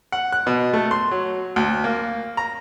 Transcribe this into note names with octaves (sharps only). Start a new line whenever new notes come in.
F#5
F#6
B2
A3
C6
F#3
D2
A#3
A#5